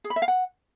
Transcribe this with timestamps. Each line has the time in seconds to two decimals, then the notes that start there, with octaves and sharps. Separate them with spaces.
0.04 G#4
0.10 B5
0.16 E5
0.22 F5
0.28 F#5